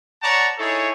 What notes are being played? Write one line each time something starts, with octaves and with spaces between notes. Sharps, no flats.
C#5 D5 F#5 A5 A#5 C#6
D#4 E4 G#4 A4 C#5